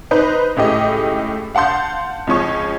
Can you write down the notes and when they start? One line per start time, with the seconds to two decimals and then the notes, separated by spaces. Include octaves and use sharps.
0.11 D#4 B4 C5 D#5
0.56 C#2 A2 G4 D#5
1.55 F5 F#5 A5 C6 G6
2.27 C#2 F3 C#4 C#6